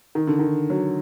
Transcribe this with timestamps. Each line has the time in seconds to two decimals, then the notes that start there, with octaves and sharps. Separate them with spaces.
0.15 D#3
0.27 D3
0.39 D#3
0.70 F#3